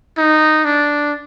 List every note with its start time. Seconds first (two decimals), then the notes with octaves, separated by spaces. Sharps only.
0.18 D#4
0.65 D4